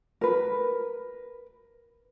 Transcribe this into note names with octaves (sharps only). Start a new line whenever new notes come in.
A#4 B4